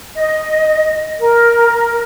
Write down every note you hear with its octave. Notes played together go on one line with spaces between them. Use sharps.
D#5
A#4